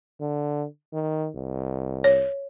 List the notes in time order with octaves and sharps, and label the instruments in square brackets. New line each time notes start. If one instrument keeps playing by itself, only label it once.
[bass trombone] D3
D#3
C2
[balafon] C#5